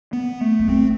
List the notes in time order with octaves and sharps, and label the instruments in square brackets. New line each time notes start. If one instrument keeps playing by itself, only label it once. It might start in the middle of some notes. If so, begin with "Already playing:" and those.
[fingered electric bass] B3
A3
[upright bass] B3
[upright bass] A3 [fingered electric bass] C4